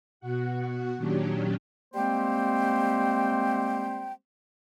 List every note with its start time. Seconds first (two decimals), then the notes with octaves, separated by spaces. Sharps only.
0.20 B2 F#4 F#5
0.97 A#2 D#3 F#3 C#4 D4 G4
1.94 G3 G#3 A#3 C4 C5 G5